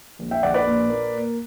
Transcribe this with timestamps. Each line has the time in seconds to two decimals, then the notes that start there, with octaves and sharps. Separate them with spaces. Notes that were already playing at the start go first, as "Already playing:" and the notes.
0.19 A#1
0.31 E5 G5
0.43 A#1 D5 F#5
0.54 B4 D5
0.67 A#2
0.90 A#3